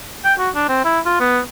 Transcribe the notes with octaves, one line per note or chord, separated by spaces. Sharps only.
G5
F#4
D4
C4
E4
F4
B3